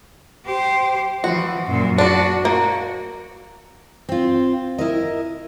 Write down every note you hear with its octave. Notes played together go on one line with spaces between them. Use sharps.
G4 C5
E3 F3 F#4
F#2 A#2
D4 F#4 D5
A#3 F#4
C4 F4
E4 A#4 D#5